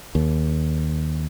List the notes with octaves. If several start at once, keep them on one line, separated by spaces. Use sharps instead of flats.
D#2